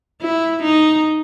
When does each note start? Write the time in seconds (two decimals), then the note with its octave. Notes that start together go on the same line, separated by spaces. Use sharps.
0.22 E4
0.63 D#4